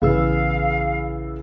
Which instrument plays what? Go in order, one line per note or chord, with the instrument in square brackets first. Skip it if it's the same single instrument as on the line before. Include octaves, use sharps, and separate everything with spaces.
[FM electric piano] A#1 G#4 E6 [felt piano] C#3 E3 B3 [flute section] F5